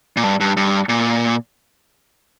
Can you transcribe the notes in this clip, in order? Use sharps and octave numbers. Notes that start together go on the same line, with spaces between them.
A#2
G2
G2
G2
A#2